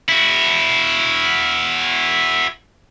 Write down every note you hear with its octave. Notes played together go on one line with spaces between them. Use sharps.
E4 F#4